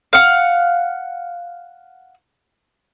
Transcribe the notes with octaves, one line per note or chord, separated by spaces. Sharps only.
F5 F#5